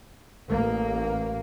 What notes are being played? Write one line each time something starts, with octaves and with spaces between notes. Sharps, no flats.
A1 A#3